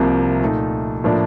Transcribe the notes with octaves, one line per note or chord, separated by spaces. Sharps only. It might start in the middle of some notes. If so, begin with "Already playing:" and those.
Already playing: C2 C3 F3 A#3
A#2 A3 D#4
A2 F3 A#3 D4